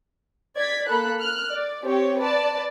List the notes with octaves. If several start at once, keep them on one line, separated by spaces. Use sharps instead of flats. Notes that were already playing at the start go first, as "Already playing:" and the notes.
D5 G#6 B6
A#3 A4 B5 F#6
F6 F#6
D5
C4 G4 C#5
B4 D5 A5